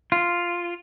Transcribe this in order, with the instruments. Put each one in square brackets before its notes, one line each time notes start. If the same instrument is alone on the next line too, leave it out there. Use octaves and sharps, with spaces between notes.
[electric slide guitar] F4